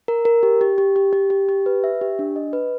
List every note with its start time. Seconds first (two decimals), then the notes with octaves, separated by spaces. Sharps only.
0.08 A#4
0.25 A#4
0.43 G4
0.61 G4
0.78 G4
0.96 G4
1.13 G4
1.30 G4
1.49 G4
1.66 B4
1.84 E5
2.01 G4
2.19 D4
2.36 D#5
2.53 B4